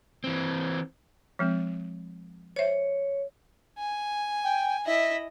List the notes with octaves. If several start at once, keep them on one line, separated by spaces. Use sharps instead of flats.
E3 C4
F3 G#3 C4
C5 C#5 E5
G#5
G5
E4 D#5 E5